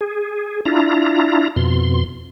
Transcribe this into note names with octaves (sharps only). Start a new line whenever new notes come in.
G#4
D4 E4 F4 A#5
F2 B2 C6